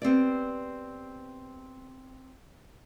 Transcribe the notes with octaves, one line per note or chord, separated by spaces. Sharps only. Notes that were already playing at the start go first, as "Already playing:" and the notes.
B3 C4 G4 D5